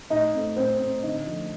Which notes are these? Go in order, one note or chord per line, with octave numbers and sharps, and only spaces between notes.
A2 D#4 D#5
A3 C4
A2 C4 C5
A3 C4
D3 D#4
F3 A3